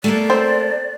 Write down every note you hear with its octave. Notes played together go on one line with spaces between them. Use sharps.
A3 A#3 A#4 D5
C4 C5